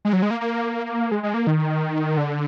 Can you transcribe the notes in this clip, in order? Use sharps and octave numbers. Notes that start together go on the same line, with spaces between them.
G#3
F#3
G#3
A#3
A#3
G#3
G#3
A#3
D#3
D3